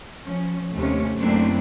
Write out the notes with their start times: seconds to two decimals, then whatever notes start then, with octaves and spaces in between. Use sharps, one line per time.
0.22 F3 C#4
0.74 D#2 C3 A3 C#4
1.16 F#2 A3 A#3 C4 D4 E4